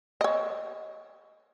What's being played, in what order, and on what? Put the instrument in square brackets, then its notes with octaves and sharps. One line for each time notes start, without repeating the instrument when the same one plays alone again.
[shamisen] C#5 D#5